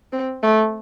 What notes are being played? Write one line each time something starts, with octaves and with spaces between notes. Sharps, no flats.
C4
A3